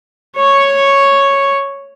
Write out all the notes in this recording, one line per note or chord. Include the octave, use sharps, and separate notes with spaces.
C#5 C#6